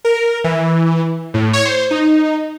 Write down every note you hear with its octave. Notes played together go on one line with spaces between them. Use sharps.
A#4
E3
A2
C#5
C5
D#4